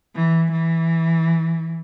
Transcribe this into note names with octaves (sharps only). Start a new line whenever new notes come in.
E3
E3